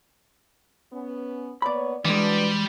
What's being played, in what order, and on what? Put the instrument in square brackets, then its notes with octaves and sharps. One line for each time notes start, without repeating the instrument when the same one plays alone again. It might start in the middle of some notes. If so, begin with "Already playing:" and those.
[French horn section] B3 C#4
[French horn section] A#3 B3 C#5 [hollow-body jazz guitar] D5 B5
[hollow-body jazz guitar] E3 G#3 [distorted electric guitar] G3 [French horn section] D4 F#4 B4